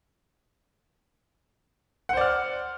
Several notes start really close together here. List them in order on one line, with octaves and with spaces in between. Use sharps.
F#5 C5 D5 F6